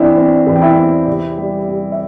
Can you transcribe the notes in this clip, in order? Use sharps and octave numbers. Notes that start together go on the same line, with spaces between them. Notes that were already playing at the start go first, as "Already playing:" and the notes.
Already playing: E3 C4 D4 E4 E5
C4
E2
G5
E4 E5
C4
C3
G3
G3
E5